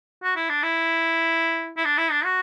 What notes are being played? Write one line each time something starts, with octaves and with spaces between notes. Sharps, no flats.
F#4
E4
D4
E4
E4
D4
E4
D4
F#4